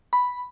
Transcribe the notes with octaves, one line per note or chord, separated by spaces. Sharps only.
B5